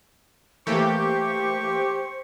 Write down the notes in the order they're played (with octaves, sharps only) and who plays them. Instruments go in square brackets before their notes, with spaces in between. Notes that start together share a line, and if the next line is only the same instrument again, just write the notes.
[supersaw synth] E3 A3 A#3 [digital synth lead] G4 [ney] C5 [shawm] C#6